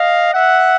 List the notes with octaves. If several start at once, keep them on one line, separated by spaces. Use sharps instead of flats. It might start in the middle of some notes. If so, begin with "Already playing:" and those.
Already playing: D#5 F5
E5 F#5